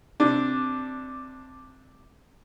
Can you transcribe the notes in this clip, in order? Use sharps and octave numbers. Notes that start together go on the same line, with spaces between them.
C3 D4